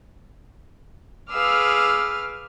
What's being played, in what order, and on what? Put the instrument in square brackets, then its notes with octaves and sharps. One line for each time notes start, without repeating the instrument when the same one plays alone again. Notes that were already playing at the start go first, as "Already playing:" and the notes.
[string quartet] G#4 B4 F5 D6 E6 F6